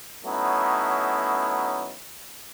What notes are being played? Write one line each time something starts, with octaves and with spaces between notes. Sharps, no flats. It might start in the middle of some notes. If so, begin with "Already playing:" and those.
F#3 A3 B3 C#4 D#4 E4